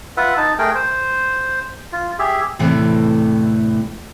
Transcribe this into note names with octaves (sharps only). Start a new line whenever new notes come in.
F4 B4 E5 F#5
D#4 A5
A3 G#4 A#4 G5
C5
F4
G4 G#4 E5
E2 A2 C3 E3 A3 C4